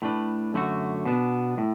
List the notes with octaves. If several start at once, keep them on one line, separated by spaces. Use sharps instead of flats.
A2 A3 D4 B4
F#2 D3 A3 F#4
B2 B3 D4
A2